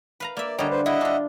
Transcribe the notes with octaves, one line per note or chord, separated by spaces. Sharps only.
B4 F5 A#5
A#3 D5 E5
D3 G3 C#5 D#5 A#5
B4 C5
E4 D#5 E5 F#5
D4 F4